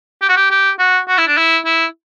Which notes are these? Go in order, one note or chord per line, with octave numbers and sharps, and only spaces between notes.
G4
F#4
G4
G4
F#4
F#4
E4
D4
E4
E4